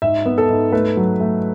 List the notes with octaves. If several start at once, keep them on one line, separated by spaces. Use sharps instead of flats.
G#2 E5
B3
A4
G#2
A3 B4
F#3
A3